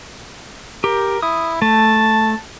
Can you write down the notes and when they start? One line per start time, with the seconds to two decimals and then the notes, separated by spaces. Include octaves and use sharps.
0.84 G4 A#4
1.22 E4 D#6
1.62 A3 A5